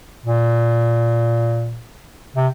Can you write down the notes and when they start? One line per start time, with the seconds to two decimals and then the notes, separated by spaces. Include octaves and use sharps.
0.26 A#2
2.36 C3